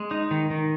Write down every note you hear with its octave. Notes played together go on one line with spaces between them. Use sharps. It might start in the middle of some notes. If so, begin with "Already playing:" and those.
Already playing: G#3
D#4
D#3
D#3